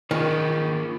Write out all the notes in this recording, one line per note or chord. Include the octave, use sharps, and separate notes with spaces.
D#3 A#3 F4 G#4